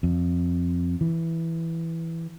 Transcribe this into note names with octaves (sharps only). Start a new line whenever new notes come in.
F2
E3